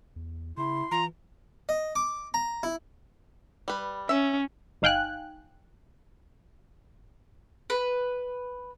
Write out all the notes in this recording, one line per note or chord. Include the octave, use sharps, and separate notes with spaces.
E2
C#3 E4 C6
E3 F4 A#5
D#5
D6
A#5
E4
G3 B4
C#4 C#5 E5
G1 D#4 F5 G5 G#5 F#6
B4